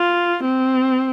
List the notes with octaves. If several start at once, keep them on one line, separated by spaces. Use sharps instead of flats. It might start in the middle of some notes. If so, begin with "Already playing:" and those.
Already playing: F4
C4